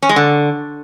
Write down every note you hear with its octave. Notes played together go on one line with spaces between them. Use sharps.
C#4
G#3
D3